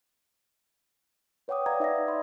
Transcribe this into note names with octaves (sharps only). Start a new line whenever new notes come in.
B4 C#5 F#5 G5 D6 D#6
B4 D5 F5 F#5 A#5 G#6
D#4 E5 D#6 A#6
D5 B5 C6